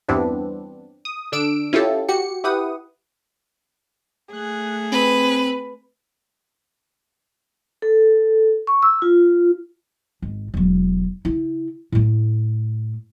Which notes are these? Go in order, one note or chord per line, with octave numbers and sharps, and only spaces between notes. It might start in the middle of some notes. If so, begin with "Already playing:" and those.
E2 G2 E3 B3 C4 D4
D#6
D3 D4 E6 D7
C#4 E4 F4 G4 A4
F#4 G4 C#7
E4 G4 B4 F#5 D#6
A3 G#4 F#6
C4 B4
A4
C#6
E6
F4
G#1
E1 F#3
C#3 E4
A2 A3